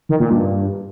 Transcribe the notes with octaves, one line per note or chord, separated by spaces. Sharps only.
D#3
A#2
G2